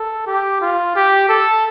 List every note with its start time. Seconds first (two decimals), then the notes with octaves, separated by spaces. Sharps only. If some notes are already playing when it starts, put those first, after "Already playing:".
Already playing: A4
0.27 G4
0.61 F4
0.96 G4
1.29 A4